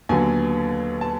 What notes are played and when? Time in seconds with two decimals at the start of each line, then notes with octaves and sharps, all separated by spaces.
0.09 D#2 D3 F#3 B3 G#5
1.01 A5